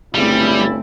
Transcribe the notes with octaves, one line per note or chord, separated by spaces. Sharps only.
G1 C#3 G3 A3 C4 E4